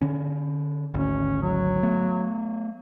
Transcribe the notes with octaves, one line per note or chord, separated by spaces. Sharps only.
D3 C#4
G#1 D2 C#4
F#3
A3 B3